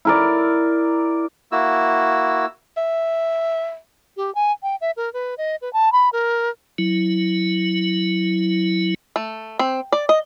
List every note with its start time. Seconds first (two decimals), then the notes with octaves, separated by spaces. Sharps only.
0.05 E4 A#4 D5
1.52 A#3 E4 F#4 E6
2.77 E5
4.17 G4
4.35 G#5
4.63 G5
4.81 E5
4.97 A#4
5.13 B4
5.38 D#5
5.62 B4
5.73 A5
5.92 B5
6.13 A#4
6.78 F#3 E4
9.16 A3
9.59 C4
9.92 D5
10.09 D#5